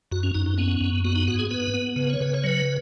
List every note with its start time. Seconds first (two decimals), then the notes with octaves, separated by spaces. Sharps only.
0.12 F#2 F#4
0.23 C#4
0.34 F#2 D#4
0.46 D#4
0.58 B3 C#4
0.81 F#2
1.04 B3 F#4
1.16 D#4
1.28 G#2 F#4
1.39 G#4
1.51 B3 B4
1.74 B3
1.96 C#3 B4
2.10 C#5
2.20 C#3 B4
2.34 C#5
2.44 F#3 B4